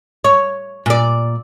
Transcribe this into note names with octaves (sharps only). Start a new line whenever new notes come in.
C#5
A#2 D5